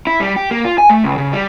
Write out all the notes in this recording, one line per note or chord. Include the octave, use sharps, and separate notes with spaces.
E4
G3
G4
A#3
F4
G#5
A3
C#2
C#3
G3